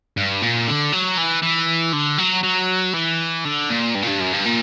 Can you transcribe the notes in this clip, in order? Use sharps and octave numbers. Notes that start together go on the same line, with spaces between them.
G2
A#2
D3
F#3
E3
E3
D3
F#3
F#3
E3
D3
A#2
G2
A#2
G2
F#2
G2
A#2